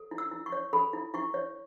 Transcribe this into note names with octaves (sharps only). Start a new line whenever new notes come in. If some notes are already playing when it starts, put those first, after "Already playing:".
Already playing: A4
E4
E6
E4
C#6
C#5
A4 B5
E4
E4 C#6
C#5